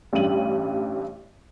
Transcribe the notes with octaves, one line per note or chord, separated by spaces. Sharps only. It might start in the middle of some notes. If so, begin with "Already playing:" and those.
A1 G2 G3 C#4 D#7 F#7